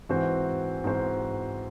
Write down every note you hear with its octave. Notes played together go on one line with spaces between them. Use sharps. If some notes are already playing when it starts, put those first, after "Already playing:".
G#2 E3 C4 F#4 C5
G#2 E3 C4 F#4 C5